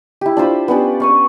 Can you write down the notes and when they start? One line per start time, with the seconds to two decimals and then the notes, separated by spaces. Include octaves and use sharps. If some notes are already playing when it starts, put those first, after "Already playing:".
0.21 E4 G4
0.37 D4 F4 C5 B5
0.68 B3 C#4 D4 G4
1.00 F5 C#6 D#6